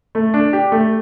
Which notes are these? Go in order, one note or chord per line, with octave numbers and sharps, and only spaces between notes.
A3
D4
G4
A3